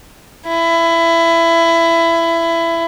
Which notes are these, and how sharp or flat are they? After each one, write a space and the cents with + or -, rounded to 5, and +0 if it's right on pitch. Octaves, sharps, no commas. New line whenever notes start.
E4 +20